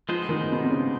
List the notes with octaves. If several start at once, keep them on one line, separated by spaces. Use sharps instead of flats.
F3 G#3 B3 D#4 G#4 C5
D#3
B2
C3
C#3